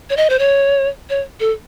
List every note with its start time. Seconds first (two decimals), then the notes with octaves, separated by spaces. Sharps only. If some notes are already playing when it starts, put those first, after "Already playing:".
0.10 C#5
0.17 D#5
0.30 C5
0.39 C#5
1.10 C#5
1.40 A4